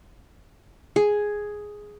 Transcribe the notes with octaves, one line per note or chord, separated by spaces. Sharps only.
G#4